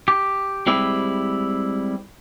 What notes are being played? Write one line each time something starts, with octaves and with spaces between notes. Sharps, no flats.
G4
G3 G#3 C4 E4 G4